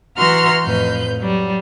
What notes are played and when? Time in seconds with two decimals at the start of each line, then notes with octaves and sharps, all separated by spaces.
0.16 E3 F#4 A#5 C6 F6
0.63 F2 A2 B4 G6
1.18 F#3 G3